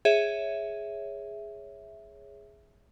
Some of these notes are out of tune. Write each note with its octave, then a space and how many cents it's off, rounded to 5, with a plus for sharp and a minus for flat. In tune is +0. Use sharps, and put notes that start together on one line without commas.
G#4 +0 C#5 +5 E5 +0